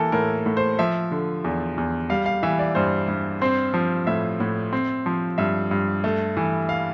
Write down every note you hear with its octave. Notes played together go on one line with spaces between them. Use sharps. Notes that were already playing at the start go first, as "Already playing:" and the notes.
Already playing: E3 A#3 A4 A#4
A2 A#4
A2
C5
F3 E5
D3
E2
E2
G3 F5
F5
E3 E5
D5
G2 C5
G2
C4 C5
F3
A2 E5
A2
C4
F3
G2 E5
G2
A3
E3
F5